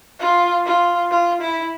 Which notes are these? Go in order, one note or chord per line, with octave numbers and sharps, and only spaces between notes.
F4
F4
F4
E4